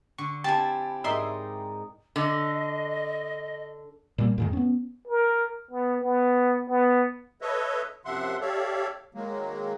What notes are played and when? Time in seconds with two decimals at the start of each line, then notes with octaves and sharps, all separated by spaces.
0.18 D3 C#6
0.44 C4 E4 G4 G#5 A5
1.04 G#2 D#4 A#4 D5 E5 C6 D#6
2.16 D3 D#5
4.18 A#2 G3 A#3
4.38 F2 G#2 D#3
4.53 B3 C#4
5.08 A#4
5.71 B3
6.01 B3
6.69 B3
7.41 A4 B4 C#5 D#5 E5
8.05 F#2 C3 F3 E5 F#5 C6
8.41 G4 A4 C#5 D5 E5 F5
9.14 D#3 F#3 G#3 A#3